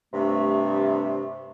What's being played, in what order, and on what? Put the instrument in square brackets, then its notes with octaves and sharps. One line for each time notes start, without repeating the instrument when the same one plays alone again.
[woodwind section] G2 C3 A3